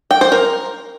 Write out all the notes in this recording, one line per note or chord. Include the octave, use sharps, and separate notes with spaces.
G5
C5
A#4